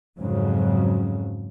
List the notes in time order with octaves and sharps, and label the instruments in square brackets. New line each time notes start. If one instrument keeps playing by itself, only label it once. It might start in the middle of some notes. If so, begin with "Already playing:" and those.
[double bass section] F2 G#2 C#3 F#3